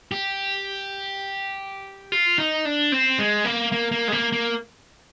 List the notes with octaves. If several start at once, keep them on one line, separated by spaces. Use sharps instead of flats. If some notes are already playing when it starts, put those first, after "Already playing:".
G4
F4
D#4
D4
C4
G#3
A#3
A#3
A#3
G#3
A#3
A#3